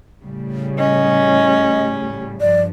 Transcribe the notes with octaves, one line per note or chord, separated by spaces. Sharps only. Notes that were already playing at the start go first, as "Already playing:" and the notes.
A2 C#3 G3
C#4 D#5
G2 F3 D5